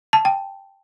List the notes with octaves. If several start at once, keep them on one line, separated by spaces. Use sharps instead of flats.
A5
G5